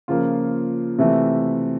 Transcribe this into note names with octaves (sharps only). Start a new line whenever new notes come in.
C#3 F3 A#3 F4
C3 E3 A3